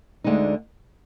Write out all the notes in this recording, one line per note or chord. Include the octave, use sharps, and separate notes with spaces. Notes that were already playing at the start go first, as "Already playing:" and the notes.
D2 D3 G#3 D#4